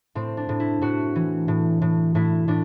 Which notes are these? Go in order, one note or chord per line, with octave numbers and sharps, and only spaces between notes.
A2 C4
D4
A2
E4
A2 F#4
E3
A2
A2
A2 E4
A2 D4